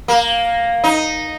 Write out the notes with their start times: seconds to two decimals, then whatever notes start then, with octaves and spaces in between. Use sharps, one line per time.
0.08 A#3
0.84 D#4